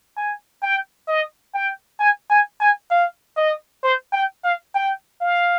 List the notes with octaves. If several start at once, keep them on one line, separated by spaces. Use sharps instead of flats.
G#5
G5
D#5
G5
G#5
G#5
G#5
F5
D#5
C5
G5
F5
G5
F5